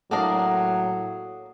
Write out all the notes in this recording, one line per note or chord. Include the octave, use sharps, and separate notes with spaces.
A2 F#3 A#3 D4 A4 A#4 F#5 D#6